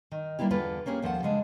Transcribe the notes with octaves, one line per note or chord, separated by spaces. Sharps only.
D#3
G3 A#3 B3 E4 G4
E2 D3 F4 B4
A#3 C#4 G4 G#4
D#2 F3 A4 E5 F#5
C#3 G#3 D4